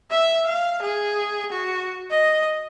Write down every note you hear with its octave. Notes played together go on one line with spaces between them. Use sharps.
E5
F5
G#4
F#4
D#5